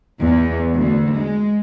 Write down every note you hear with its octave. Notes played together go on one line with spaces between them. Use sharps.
E2
D2
G#3